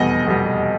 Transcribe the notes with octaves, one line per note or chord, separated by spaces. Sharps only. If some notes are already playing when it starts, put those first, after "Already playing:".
Already playing: F1 E2 B2 G3 D#5
F1 E2 B2 G3